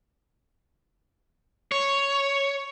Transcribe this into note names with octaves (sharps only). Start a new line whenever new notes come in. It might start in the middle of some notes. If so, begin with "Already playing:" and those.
C#5